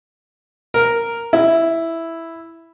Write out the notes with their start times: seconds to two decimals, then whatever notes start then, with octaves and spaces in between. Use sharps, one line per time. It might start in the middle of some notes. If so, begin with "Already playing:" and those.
0.74 A#4
1.33 E4